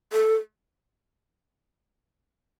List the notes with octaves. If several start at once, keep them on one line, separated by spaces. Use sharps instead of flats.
A4